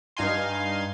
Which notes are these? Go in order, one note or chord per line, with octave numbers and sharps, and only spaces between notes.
G2 D#4 F5 G#5 C6